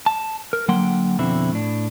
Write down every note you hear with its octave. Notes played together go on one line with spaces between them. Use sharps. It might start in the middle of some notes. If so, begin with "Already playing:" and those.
A5
A#4
D3 F#3 A#3 F#5 G5 C6
F2 B2 D3 C4 E4
A2 D4